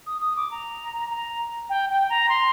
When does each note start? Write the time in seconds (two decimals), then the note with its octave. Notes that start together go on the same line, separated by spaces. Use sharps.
0.07 D#6
0.22 D#6
0.36 D6
0.51 A#5
1.10 A#5
1.70 G5
1.90 G5
2.10 A#5
2.29 C6